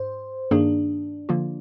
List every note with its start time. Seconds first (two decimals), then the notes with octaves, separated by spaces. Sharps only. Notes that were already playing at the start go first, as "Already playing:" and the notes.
Already playing: G#2 C5
0.51 G2 D#3 A#3 D4 D#4 G#4
1.29 D3 F3 A#3 F4